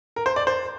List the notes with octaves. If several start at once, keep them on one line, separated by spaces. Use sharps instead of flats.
A#4
C5
D5
C5